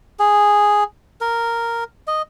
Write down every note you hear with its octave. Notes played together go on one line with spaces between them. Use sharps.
G#4
A#4
D#5